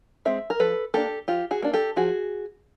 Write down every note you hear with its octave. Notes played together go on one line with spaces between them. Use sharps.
G#3 C4 E5
A#4
F3 A4 B4
A#3 D4 G4 A4
F3 F4 G4
F#4 G#4
A#3 D4
G4 A4
F3 F#4 G#4